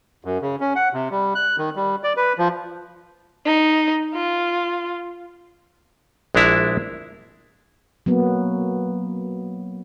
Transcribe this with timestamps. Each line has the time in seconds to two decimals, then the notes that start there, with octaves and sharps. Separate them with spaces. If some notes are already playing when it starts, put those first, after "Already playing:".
0.25 F#2
0.42 C#3
0.60 C#4
0.76 F#5
0.93 C3
1.11 G3
1.35 F#6
1.58 D#3
1.76 G3
2.04 D5
2.17 B4
2.38 F3
3.45 D#4
4.14 F4
6.35 A#1 G#3 D4 E4 A#5
8.06 F#3 A#3 B3